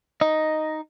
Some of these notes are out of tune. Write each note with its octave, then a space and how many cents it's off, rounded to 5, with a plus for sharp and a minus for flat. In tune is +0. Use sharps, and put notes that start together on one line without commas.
D#4 +0 D#5 +0